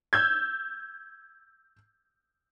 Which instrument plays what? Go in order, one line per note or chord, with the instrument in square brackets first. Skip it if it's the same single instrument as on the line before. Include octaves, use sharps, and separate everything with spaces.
[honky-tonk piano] E6 G6 G#6